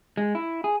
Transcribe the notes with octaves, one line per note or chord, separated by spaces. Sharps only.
G#3
E4
G#4